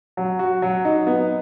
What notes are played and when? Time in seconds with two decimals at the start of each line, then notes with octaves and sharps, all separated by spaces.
0.17 F#3
0.39 F#4
0.62 F#3
0.85 D#4
1.07 B3